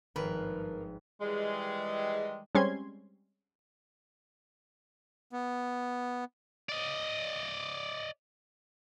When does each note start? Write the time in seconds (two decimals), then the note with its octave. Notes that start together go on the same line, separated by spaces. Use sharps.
0.16 G#1 G2 F3 A#4 B4
1.21 D#3 E3 G3 G#3
2.55 G3 G#3 C4 C#4 C6 G#6
5.32 B3
6.69 D5 D#5